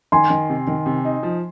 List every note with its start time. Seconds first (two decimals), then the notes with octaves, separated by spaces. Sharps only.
0.12 D#3 G#5 C6
0.30 D#3
0.49 C3
0.67 D#3
0.86 C3
1.05 D#4
1.23 F3